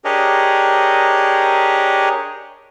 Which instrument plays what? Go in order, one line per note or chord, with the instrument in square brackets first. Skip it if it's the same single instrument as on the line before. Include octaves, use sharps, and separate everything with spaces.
[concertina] D4 G4 G#4 A#4 C#5 D#5